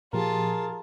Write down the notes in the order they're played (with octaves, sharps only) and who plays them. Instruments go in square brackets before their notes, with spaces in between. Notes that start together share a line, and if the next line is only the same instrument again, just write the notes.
[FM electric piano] A#2 F3 G4 [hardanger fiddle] F4 A5 [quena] G#4 [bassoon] A#4